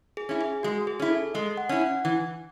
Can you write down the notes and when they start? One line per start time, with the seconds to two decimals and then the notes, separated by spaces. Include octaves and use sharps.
0.17 G#4
0.29 C#4 E4
0.41 G#4
0.63 G#3 F#4
0.87 G#4
1.00 C#4 E4
1.10 A4
1.34 G#3 D#5
1.57 F#5
1.69 C#4 E4
1.82 F#5
2.05 E3